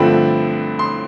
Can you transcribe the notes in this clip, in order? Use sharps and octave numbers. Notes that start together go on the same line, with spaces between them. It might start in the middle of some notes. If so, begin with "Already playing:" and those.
Already playing: G2 D3 F3 A3 C4 B5
C6